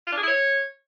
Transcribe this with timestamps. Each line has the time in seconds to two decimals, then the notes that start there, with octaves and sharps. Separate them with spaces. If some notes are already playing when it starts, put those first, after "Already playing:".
0.07 F4
0.12 D4
0.17 G#4
0.23 E4
0.28 C#5